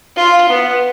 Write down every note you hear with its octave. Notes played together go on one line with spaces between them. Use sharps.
F4
B3